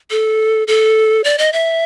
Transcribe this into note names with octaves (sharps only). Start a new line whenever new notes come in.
A4
A4
D5
D#5
E5